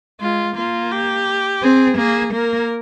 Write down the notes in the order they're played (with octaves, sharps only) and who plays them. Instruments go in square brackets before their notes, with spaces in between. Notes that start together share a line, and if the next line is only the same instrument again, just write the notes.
[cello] G#3 [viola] F4
[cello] A#3 [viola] F4
[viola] G4
[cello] C4 [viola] G#4
[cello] A#3 [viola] G#4
[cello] A#3 [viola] A#4